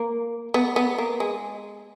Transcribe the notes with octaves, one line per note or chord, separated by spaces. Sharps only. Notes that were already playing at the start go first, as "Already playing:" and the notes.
Already playing: A#3
B3
B3
A#3
G#3